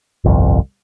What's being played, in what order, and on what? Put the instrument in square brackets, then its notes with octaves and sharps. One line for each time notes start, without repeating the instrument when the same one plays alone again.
[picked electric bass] G1 C2 F2